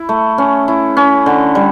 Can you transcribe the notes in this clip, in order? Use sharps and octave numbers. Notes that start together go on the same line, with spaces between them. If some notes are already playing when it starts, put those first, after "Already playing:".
Already playing: E4
A3
C#4
E4
C#4
D3
G3